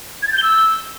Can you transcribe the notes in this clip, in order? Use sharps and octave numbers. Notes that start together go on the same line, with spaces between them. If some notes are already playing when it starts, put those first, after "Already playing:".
G#6
A6
G6
G7
E6